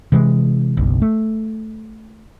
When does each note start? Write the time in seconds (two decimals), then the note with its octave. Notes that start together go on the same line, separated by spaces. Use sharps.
0.12 C3 E3 G#3
0.77 F#1 B1
1.02 A3